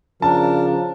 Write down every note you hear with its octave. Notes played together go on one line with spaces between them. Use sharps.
C#3 F3 D4 A#4 A5